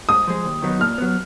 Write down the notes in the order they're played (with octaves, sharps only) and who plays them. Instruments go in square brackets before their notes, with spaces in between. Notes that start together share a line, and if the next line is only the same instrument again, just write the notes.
[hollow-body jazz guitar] G#2 [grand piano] D#6
[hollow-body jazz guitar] F3 G#3
D#2
D#3 F#3 B3 D#4
[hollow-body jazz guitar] A#2 [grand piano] F6
[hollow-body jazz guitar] F#3 B3